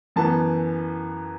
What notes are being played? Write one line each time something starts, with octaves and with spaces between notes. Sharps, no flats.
F#2 E3 B3 A5